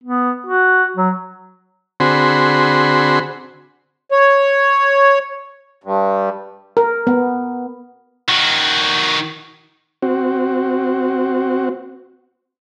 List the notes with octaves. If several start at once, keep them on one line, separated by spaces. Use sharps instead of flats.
B3
F#4
F#3
D3 C4 F#4 G#4 B5 C6
C#5
G2
A#4
B3
D#3 F#4
C4 F#4